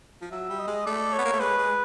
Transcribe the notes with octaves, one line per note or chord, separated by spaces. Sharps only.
F3
F#3 E5
G3
D#5
G#3
A3 D5
C#5
B3
A#3
A3
G#3 B4
G#3